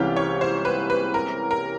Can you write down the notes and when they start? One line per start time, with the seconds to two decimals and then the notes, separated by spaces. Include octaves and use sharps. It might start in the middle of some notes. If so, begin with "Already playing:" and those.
Already playing: C2 C3 E3 G#3 C#4 F4 G4
0.16 C#5
0.41 C5
0.65 B4
0.90 B4
1.14 A#4
1.51 A#4